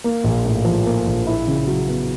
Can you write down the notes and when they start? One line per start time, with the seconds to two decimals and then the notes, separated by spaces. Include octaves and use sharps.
0.04 A#3
0.24 A#1
0.45 A2
0.65 F3
0.86 A#3
1.07 A#1
1.27 E4
1.47 C#3
1.67 F#3
1.88 B3